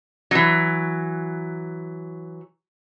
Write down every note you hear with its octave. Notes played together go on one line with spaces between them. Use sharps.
E3 F#3